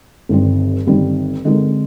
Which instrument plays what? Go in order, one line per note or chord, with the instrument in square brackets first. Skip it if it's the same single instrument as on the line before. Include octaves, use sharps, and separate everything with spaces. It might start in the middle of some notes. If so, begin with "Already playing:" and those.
[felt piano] G1 G2 D#3 G3 C4
G1 G2 D#3 G3 C4
D3 G#3 C4 D#4 A#4